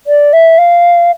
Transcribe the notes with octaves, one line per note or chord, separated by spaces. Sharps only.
D5
E5
F5